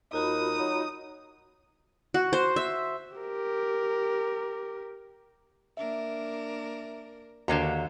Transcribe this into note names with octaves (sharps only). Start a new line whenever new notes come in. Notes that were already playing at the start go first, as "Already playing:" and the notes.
D#2 D#4 F4 F#4 B5 D#6
F#3
F#4
C5
E5
G4 A#4
A#3 D4 A#4 E5
D#2 D3 A#3 F#4 C5 A#5